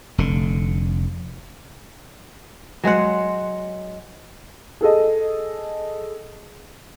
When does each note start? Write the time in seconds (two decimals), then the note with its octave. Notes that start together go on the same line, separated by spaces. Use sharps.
0.18 F1 D3
2.84 F#3 G#3 C5 F#5
4.81 G#4 A4 D#5